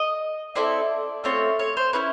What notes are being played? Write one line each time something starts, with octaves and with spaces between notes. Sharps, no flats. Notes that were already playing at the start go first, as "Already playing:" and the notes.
Already playing: D#5
C4 E4 A4 D5
A3 C4 F4 C#5
C#5
C5
C#4 E4 B4